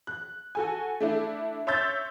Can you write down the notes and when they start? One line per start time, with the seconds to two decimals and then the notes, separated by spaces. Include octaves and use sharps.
0.07 F#6
0.55 F#4 A4 G#5
1.00 A3 D4 E4
1.67 C#5 E5 C6 E6 G6 A6